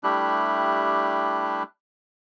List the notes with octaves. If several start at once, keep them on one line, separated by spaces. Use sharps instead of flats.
G3 A3 D4 E4 G4 F#6